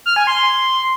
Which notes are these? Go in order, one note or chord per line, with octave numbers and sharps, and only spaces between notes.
F6
G#5
C6